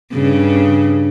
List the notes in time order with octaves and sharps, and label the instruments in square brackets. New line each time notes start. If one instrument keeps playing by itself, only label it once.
[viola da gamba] G2 C#3